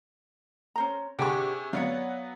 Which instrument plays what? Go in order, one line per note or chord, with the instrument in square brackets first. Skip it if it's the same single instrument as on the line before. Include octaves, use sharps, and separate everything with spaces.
[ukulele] C#4 C5 A#5
[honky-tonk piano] C3 G#4 C#6 [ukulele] D4 G4 F#5
[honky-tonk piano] F#3 B3 F#5 [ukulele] C#5 D5 F5